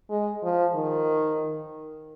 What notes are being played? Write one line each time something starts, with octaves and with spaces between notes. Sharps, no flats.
G#3
F3
D#3